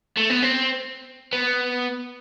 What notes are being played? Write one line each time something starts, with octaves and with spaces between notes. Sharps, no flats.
A3
B3
C4
B3